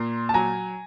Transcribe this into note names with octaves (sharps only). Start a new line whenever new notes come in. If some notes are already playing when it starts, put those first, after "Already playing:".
Already playing: A#2 A#5 C6
A5
F#3 G#5 A#5